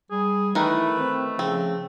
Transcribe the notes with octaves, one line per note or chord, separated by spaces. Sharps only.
G3 G#4
D#3 E3 A3 A#4 B4
C4
C#3 F3 C4